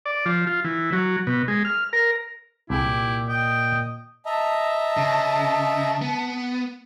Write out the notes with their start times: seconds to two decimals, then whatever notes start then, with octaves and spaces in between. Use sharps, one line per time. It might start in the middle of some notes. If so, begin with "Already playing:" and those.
0.06 D5
0.26 F3
0.47 F4
0.64 E3
0.93 F#3
1.27 B2
1.48 G#3
1.65 F6
1.93 A#4
2.70 C2 A#2 E4 G4 G#4
3.29 D#5 G5
4.26 D#5 E5 A5 A#5
4.97 C#3
6.02 B3